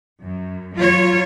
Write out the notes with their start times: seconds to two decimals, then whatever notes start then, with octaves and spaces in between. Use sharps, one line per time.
0.23 F#2
0.76 F#3 F4 C#5